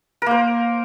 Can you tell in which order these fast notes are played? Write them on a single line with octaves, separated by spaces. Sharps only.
A#4 A#3 C5